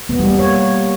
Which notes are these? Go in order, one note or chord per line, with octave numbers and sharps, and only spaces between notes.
B3
G3
A#3
C#5